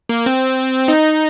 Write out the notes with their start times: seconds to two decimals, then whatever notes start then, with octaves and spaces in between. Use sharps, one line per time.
0.09 A#3
0.26 C4
0.88 D#4